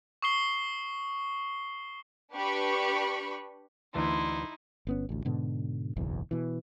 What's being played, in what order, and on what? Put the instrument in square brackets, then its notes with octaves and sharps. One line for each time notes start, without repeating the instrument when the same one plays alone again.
[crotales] C#6 D#6 C7 G7
[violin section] D4 G4 B4 B5 C#6
[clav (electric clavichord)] D2 E3 A5 [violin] D#4 E4 [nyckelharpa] C6
[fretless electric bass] G1 B3 C#4
A1 D2
G#2 B2 D3
F#1 B1 E2
B2 E3